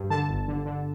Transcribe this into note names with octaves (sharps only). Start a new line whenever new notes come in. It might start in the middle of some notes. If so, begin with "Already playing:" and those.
Already playing: G2
D3 A5
G1
D3
D3